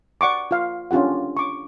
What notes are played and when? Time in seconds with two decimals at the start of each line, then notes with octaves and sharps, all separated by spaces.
0.21 D5 F#5 C#6 D6
0.51 F4 F5
0.91 C#4 D4 F4 G4 F#5
1.37 C#6 D6